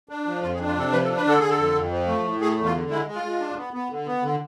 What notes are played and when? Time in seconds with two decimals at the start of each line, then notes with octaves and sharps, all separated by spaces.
0.09 D4
0.26 F3
0.42 F2 F4
0.55 G#4
0.59 D4
0.67 F4
0.76 C3 A4
0.92 F3 B4
1.04 A4
1.08 D4
1.17 B4
1.25 D3 A4
1.40 D3 G#4
1.50 A4
1.58 F2
1.75 F2
1.91 F3
2.07 A3
2.25 A2
2.40 A3 G#4
2.57 E2
2.65 F4
2.74 D3
2.90 G#3 E4
3.07 G#3
3.15 F4
3.23 G#3
3.40 D4
3.57 B3
3.73 B3
3.90 D3
4.06 B3
4.23 D3